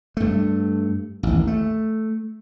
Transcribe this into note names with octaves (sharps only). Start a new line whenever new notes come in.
G2 A3
A1 D#2
A3